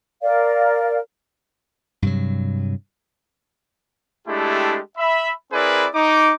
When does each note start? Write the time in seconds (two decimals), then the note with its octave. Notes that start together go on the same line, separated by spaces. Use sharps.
0.23 A#4 D5 F5
2.02 G2 C3 F#3
4.28 G#3 A3 D4 E4 G4
4.98 E5 B5
5.52 C4 E4 G#4 A#4 B4 D5
5.94 D#4 D6